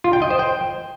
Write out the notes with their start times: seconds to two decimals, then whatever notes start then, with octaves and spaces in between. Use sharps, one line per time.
0.04 F4
0.13 G5
0.22 D#5
0.30 C5
0.39 G5